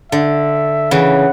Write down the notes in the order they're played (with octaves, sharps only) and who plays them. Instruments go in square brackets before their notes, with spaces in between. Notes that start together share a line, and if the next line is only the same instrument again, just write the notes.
[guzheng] D3 [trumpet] E5
[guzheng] C#3 E3 [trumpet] F#5